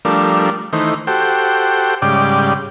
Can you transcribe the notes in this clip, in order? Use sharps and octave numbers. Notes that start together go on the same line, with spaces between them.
F3 G3 A3 D4 A#4
D#3 E3 A3 D#4 C5
F#4 G4 A4 C5 G5
G#2 C#3 G3 D5 G5